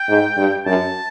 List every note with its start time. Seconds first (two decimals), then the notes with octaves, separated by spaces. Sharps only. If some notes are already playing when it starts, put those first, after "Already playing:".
Already playing: G5
0.09 G#2
0.37 G2
0.66 F#2 A5